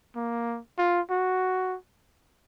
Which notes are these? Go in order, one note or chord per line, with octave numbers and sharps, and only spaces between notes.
A#3
F4
F#4